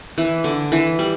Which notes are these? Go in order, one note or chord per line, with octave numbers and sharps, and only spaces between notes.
E3
D3
E3
G3